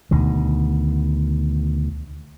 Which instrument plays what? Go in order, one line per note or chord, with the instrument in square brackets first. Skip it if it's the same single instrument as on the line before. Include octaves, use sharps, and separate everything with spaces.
[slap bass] D2 B2 D#3